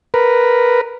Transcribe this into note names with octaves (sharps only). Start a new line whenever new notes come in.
A#4 B4